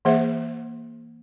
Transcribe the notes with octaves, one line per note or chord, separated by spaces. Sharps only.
E3 A#3 G#4 C5 E5 F#5